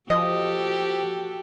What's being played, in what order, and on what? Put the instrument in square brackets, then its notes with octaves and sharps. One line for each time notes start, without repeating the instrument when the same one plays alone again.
[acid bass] F3 [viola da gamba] F#4 G4 A4 [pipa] D#5